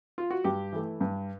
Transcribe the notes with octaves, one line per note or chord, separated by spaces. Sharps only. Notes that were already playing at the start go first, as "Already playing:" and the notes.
F4
F#4
G2 G4
E3 A3
G2